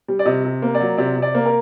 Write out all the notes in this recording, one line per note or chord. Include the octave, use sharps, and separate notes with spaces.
G3
D5
C3 D#5
C3
A#3
D5
F#3
C3 D5
C3
D5
A#3
A#4